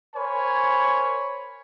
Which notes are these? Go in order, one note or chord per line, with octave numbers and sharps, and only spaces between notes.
A#4 C5 C#5 G#5 B5